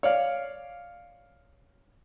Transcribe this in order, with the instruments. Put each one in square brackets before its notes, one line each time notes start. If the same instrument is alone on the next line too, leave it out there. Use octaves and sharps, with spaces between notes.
[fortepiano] C#5 D5 F5